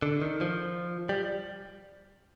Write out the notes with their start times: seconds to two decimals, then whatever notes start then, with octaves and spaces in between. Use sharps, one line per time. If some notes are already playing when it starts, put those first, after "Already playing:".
0.02 D3
0.22 D#3
0.41 F3
1.09 G3